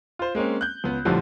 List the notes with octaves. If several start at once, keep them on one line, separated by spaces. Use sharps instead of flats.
F4 C5
G#3 A#3 C4 C#4
F#6 G6
C#2 B3
A#1 A2 D3 F3 G3